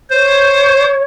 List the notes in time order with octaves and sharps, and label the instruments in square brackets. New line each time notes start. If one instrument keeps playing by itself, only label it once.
[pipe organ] C5 [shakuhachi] C#5